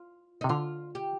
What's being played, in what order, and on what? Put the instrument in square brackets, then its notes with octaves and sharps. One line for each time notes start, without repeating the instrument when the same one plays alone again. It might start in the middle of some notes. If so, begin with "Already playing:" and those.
Already playing: [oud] F4
D#4
[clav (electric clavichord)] C3
[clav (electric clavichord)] D3 [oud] F4
[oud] G4